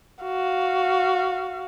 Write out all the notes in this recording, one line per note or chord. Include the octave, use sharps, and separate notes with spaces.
F#4 F5